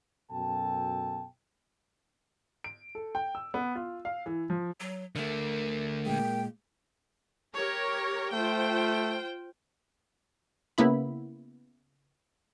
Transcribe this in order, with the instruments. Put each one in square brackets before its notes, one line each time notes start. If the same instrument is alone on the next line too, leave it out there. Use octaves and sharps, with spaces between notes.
[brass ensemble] F#2 B2 A4 G5 A5
[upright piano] D7
A4
G5
E6
B3
F4
F5
E3
F3
[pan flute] F#3
[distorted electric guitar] D3 A3 [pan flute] A#4
[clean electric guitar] A#2 G#3 [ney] G5
[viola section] G4 A#4 C#5
[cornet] A3 [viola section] F4 C5 G5
[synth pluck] C#3 A#3 B3 E4 B5